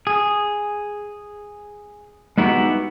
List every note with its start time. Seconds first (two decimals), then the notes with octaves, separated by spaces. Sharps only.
0.07 G#4
2.38 G#3 B3 D#4 E4 F#4 G4